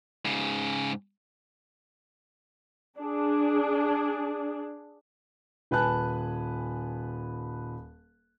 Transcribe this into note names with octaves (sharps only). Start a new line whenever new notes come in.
G#2 C#3
D4 G#4
D#1 B4 G#5 A5 F#6